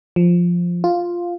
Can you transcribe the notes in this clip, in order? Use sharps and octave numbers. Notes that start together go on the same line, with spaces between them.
F3
F4